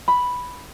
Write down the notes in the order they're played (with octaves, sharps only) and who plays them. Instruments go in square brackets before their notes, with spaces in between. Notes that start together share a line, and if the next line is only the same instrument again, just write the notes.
[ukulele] B5